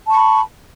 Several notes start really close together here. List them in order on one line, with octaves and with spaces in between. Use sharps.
A5 C#6 B5